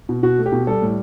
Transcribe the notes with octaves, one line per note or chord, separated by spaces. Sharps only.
B2
B2 F#4
A3
G4
B2
G3 A4
A2